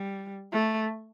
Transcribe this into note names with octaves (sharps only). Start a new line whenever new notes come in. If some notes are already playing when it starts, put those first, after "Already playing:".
Already playing: G3
A3